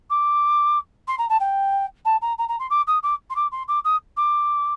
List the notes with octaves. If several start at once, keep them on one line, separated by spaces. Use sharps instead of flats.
D6
C6
A#5
A5
G5
A5
A#5
A#5
A#5
C6
D6
D#6
D6
C6
D6
C6
D6
D#6
D6